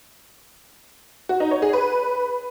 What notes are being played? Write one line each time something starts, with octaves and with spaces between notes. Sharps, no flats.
F#4
D#4
C#5
G#4
B4